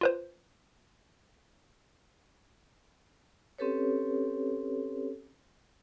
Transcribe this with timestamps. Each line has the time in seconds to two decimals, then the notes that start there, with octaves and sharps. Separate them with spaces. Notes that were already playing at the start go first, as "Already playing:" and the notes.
0.01 F4 B4 C5
3.58 C4 C#4 G4 A4 B4 C#5